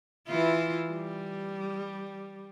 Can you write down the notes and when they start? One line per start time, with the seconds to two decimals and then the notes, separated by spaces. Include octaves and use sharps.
0.28 E3 E4 F4
0.90 G3